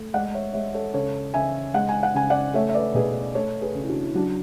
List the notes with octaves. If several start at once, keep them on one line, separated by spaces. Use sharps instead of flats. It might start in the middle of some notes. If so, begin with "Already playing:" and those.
Already playing: A3
G#3 D5 F#5
C#5 E5
G#3 C#5 E5
A4 C#5
C#3 A4 C#5
C#3 E5 G#5
G#3 F#5
G#5
F#5
C#3 G#5
D5 F#5
A3 C#5 E5
E5
B4 D5
B2 G#4 B4
A3 A4 C#5
G#4 B4
C#3
E4
D4 F#4
E4
F#3 D4 F#4